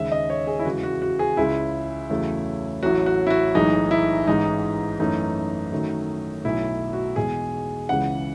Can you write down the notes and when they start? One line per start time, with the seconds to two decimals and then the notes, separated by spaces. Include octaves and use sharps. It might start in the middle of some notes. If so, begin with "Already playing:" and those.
Already playing: D#2 C#3 G#3 E5
0.12 D#5
0.30 C#5
0.47 G#4
0.59 E4
0.65 E2 C#3 E3 G#3 F#4
0.83 F#4
1.02 F#4
1.19 G#4
1.37 C#2 C#3 G#3 E4
2.10 E2 C#3 F#3 A3
2.83 A1 A2 F#3 A3 F#4
3.06 F#4
3.27 E4
3.30 F#4
3.55 B1 A2 E3 G#3 D#4
3.91 E4
4.27 A1 G#2 E3 G#3 D#4
5.00 F#2 E3 A3 D#4
5.72 F#2 D#3 F#3 A3
6.44 B1 B2 A3 E4
6.93 F#4
7.16 E2 B2 G#3 G#4
7.89 C#2 C#3 E3 G#3 F#5